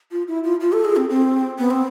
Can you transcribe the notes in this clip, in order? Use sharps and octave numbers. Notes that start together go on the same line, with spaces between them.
F4
E4
F4
F4
A4
G#4
C4
C4
B3
C4